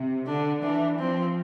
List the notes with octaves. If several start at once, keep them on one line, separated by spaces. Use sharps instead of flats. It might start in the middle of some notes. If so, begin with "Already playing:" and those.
Already playing: C3
D3 D4
E3 D4
F3 C4